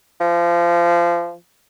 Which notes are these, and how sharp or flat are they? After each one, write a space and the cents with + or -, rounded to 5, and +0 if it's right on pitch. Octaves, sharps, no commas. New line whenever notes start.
F3 -25